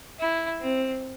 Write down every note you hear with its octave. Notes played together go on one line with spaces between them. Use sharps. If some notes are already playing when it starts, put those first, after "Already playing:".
E4
C4